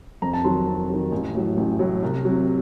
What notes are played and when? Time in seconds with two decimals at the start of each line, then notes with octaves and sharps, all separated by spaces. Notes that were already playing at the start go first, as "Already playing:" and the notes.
0.22 F2 A#5
0.33 A5
0.44 D#3 F#3 C6
0.67 F2
0.89 D#3 F#3
1.12 A1
1.35 A2 F#3
1.57 A1
1.79 A2 F#3
2.03 C2
2.25 C3 F#3